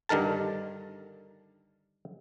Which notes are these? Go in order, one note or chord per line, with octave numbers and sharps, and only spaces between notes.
G2 D3 D#3 A#4 A5